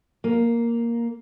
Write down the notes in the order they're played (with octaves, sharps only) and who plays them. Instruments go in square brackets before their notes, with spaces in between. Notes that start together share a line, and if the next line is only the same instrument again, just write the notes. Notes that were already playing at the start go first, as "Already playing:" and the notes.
[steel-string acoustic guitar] A#3